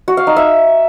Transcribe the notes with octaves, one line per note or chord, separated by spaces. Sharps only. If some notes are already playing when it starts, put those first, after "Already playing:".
F#4
F5
D#4
E5